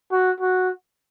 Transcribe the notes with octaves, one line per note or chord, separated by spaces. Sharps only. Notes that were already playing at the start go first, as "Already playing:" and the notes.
F#4
F#4